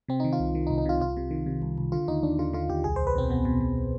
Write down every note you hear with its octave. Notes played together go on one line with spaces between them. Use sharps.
C3 C4
D#3 D#4
F4
C2
D#3
D#4
C2
D#4
C3 F4
C2 F4
C3
D#3
C3
C2
C2
D3 F4
D#2 D#4
D#2 D4
D3 F4
D3 F4
D#2 G4
C2 G#4
C2 C5
B4
B2 C4
B2 B3
B2
B2